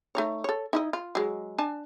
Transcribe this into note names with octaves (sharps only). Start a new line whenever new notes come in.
A3 D#4 C#5
A4 C#5
D#4 E4 D#5
F4
F#3 G#3
D4 G#5 A5